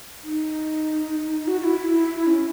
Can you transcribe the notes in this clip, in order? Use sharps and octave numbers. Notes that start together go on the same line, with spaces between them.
D#4
F#4
F#4
E4
E4
C#4